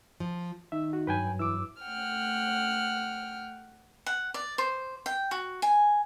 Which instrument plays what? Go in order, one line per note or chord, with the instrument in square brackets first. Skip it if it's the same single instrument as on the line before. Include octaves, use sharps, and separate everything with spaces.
[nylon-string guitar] F3
[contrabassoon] D#3 [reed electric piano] E5
[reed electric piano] F#4
[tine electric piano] G2 F#3 [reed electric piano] B4 G5 G#5
[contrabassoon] E3 [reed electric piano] D6 E6
[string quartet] A3 F#5 G5 F6
[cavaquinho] F#5
D5
C5
G5
F#4
G#5